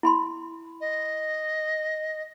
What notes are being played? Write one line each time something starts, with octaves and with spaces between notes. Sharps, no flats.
E4 B5 C6
D#5